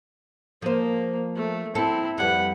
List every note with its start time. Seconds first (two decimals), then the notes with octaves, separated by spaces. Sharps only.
0.62 F3 A#3 C5
1.36 A3
1.75 C4 E4 A4
2.18 F2 G3 B4 F#5